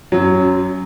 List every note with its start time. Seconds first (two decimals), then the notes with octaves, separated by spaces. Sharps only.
0.12 F#2 F#3